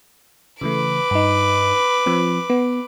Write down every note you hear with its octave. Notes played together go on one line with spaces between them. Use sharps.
C#3 E3 A3 B4 D6
G2 D#4
F3 C4
B3